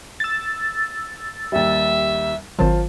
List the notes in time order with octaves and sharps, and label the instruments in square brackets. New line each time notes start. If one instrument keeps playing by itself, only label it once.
[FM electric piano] E6 A6
[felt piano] D#2 G3 [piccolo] E5
[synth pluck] G#1 D#3 F#3 [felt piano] F4 C5 A5